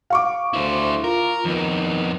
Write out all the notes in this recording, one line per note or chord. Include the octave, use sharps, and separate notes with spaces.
F5 C#6 D6
D2 E4 C5
F4 A#4
F2 D#3 B3